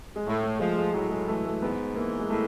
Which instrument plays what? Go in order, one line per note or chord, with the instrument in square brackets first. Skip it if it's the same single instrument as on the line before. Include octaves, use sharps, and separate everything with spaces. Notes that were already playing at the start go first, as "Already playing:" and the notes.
[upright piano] G#3
[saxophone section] A2 [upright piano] A3
[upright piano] A3
[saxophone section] F3 [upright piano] G#3
[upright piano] G#3
[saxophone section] A2 [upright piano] F#3
[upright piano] G#3
[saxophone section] E3 [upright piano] A3
[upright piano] A3
[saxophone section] G#2 [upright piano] B3
[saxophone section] E3 [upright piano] A#3
[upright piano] G#3
[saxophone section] A2 [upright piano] A3